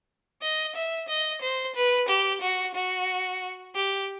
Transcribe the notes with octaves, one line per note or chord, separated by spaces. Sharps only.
D#5
E5
D#5
C5
B4
G4
F#4
F#4
G4